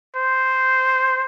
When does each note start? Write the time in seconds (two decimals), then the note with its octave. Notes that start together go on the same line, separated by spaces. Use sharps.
0.16 C5